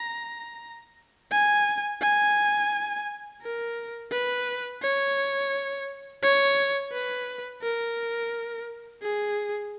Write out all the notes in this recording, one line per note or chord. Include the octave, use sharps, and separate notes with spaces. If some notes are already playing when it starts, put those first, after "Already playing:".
Already playing: A#5
G#5
G#5
A#4
B4
C#5
C#5
B4
A#4
G#4